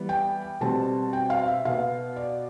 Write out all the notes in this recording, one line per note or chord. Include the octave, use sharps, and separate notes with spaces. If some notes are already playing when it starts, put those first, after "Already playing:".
Already playing: E3 G3 B3
G5
B2 G3 C4 A5
G5
F5
E5
B2 B3 F5
D5